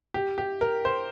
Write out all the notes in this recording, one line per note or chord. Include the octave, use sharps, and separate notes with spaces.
G4
G4
A#4
C5